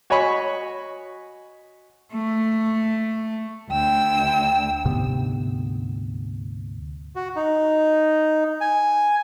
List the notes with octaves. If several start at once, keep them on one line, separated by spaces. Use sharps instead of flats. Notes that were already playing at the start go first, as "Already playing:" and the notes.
F#4 C#5 D#5 G#5 B5 C#6
A3
D2 G5 E6
D2 G#2 C3 B3
F#4
D#4
G#5